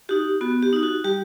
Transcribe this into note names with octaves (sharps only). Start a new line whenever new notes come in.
D#4 F#4 G4
B3 F#4
G4
D#4 F#4
F#4
G3 G4